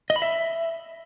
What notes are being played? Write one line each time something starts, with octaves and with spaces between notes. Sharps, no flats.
D#5
B5
E5